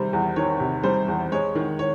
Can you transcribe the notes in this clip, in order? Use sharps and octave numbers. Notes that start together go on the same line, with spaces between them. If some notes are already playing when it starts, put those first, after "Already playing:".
Already playing: C3 D#3 G3 C5
E2
D#3 C#5
C3
G3 C5
E2
G#3 C#5
D#3
C#5